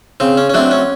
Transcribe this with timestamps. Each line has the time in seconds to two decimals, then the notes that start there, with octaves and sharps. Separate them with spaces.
0.20 C#3 C4
0.37 C#4
0.50 C#4
0.54 F#3 A3 C4 D4
0.71 C#4